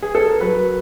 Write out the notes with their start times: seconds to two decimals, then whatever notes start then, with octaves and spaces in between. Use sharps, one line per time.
0.02 G#4
0.15 A4
0.28 A#4
0.41 F#3 B4